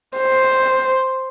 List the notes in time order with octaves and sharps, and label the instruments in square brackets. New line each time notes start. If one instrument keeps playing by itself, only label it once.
[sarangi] C5